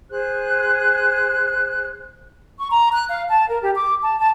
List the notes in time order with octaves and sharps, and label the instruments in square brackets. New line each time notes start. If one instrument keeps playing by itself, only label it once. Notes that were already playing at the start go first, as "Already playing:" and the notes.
[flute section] G#4 C5 F#6
C#6
A#5
F#6
F5
A5
A#4
G4
D6
A5
A5